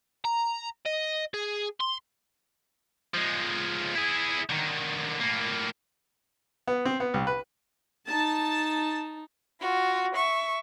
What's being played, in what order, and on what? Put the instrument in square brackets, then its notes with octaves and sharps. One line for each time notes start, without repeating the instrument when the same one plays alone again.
[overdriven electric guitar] A#5
D#5
G#4
C6
[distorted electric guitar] F3 G#3
E4 G#4
D3 D#3
A2 A#3
[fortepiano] B3
C4
B3
C2
B4
[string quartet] D#4 [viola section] A5
[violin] F4 F#4
E5 C#6